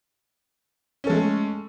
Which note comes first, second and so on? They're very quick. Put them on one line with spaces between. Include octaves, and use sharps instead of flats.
C#4 A4 G#3 A3